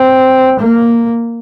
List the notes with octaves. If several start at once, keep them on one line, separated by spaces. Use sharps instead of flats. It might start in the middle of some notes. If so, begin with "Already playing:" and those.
Already playing: C4
A#3